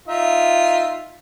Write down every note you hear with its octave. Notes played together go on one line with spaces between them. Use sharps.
D#4 F4 E5